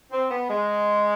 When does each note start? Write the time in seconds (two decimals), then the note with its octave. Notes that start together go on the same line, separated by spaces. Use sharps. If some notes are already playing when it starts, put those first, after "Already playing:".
0.11 C4
0.30 B3
0.50 G#3